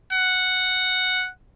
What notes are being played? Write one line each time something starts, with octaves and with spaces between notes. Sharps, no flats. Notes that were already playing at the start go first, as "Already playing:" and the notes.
F#5